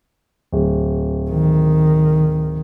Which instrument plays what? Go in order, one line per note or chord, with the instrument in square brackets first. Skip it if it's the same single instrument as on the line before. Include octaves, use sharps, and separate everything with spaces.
[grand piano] D1
[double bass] D#3